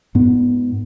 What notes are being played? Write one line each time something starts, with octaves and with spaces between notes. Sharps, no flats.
G#2 B3